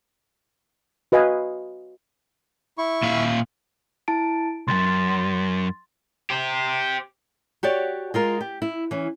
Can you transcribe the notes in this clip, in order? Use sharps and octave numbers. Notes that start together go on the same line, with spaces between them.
F#4 B4 D#5 F5 G#5 B5
E4 C#6
A#2 E5 F5
E4 A5 D7
C#2 F#2 C6 A6
G4 C5
F#4 G4 C#5 D5
G#3 F4 A#4
G4
E4
E3 C#4